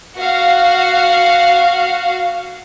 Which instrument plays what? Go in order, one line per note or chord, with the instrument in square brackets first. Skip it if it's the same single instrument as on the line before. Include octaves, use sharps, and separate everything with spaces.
[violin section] F#4 F5